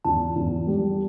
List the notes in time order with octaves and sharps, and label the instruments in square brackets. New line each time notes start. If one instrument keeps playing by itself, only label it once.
[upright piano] E2 [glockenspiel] A5
[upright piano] E2
G3